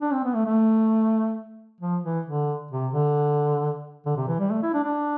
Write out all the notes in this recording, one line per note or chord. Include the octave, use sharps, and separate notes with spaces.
D4
C4
B3
A3
A3
F3
E3
D3
C3
D3
D3
C3
E3
G3
A3
E4
D4
D4